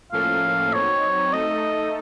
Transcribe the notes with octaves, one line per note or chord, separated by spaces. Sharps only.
A2 F3 A#3 C#4 A4 F5
F#3 C4 D#4 C#5
A3 D#4 A4 D#5